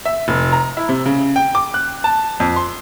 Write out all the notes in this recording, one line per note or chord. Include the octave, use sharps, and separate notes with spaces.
E5
F1
A#5
E4
C3
C#3
G5
D6
F#6
A5
F2
C6